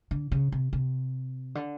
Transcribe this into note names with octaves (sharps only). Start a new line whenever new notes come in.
D3
C#3
C3
C3
D3